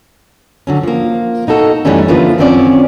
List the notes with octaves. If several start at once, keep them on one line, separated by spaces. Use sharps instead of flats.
D3 F#3 C#4
F3 A#3
B2 D#4 F#4 A4
F#2 E3 G3 A3 C#4 D#4
D3 E3 F3 A#3 F4 B4
F#2 D#3 F3 C4 C#4 D5